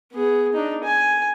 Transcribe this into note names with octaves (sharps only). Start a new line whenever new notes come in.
B3 G#4
D4 D#4
G#5